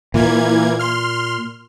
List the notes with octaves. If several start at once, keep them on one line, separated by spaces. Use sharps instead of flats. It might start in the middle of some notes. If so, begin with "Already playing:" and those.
A#2 E3 A#3 G#6
C6 F6